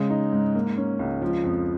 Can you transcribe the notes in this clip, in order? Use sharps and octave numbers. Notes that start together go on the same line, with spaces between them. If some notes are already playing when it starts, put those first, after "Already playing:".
Already playing: C#3 G#3
D#4
G#2
A#3
C#4
C#2
F3
F2